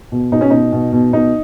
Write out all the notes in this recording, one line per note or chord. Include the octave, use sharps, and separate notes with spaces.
B2
B2 D#4
C#4
B2 D#4
B2
B2
B2 D#4